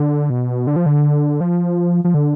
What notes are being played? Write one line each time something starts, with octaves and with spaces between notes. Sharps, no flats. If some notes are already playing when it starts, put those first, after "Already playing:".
Already playing: D3
B2
D3
F3
D3
F3
F3
D3